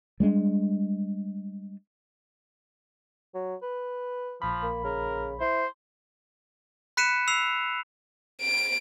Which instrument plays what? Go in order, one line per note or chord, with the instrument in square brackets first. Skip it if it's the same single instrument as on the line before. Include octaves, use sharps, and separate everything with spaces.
[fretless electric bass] G3 G#3 C4 D4
[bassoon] F#3
B4
[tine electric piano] A#1 B5 [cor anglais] F3
[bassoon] A#3
[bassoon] C#3 [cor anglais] A#4
[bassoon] E4 [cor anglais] C5
[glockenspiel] B5 F#6 B6 C#7 D#7 E7
E6 C7 F7
[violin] D7